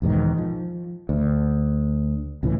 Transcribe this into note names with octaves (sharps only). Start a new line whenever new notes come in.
B1 E2 G#2 D#3
F3
D2
C#2 A2 E3